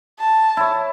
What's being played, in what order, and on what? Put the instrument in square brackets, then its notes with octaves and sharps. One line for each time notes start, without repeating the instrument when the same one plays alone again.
[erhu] A5
[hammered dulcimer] E4 C#5